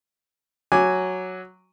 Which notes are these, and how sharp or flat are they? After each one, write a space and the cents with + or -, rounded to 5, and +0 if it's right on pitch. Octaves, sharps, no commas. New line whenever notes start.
F#3 +0 G#5 +0 D6 -5